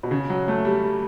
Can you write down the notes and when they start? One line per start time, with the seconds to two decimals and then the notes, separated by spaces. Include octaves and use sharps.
0.03 B2
0.11 C#3
0.30 F#3
0.48 A3
0.65 G3
0.83 G3